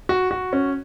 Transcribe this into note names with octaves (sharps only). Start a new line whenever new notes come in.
F#4
F#4
C#4